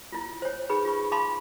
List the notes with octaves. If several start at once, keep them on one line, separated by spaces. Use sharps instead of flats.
E4 F4
C5 C#5
D#4 G#4 B4 B5
F4 C#6
F5 A5 B5 C6 D6